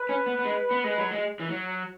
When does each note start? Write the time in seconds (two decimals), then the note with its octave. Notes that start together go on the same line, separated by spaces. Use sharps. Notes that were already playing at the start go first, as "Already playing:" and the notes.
Already playing: B4
0.09 C#4
0.26 B3
0.39 B3
0.45 G#3
0.71 B3
0.84 G#3
0.98 F#3
1.11 G#3
1.39 E3
1.50 F#3